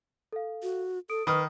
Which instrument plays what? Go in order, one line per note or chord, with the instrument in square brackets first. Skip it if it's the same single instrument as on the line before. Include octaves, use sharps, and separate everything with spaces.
[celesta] A4 F5
[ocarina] F#4
[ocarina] A4 [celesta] D#6 D7
[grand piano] D#3 D#6 [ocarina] B4 [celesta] B5 F6